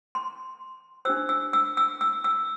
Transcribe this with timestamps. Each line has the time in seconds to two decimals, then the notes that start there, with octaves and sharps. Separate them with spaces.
0.15 C6
1.05 D4 G4 C5 E6
1.29 E6
1.53 E6
1.77 E6
2.01 E6
2.24 E6